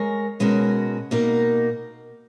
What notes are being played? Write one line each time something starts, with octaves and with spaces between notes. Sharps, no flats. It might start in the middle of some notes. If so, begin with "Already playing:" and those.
Already playing: G#3 A#4 C#5
B2 G#3 C#4 F#4 A#4
B2 A#3 D#4 A#4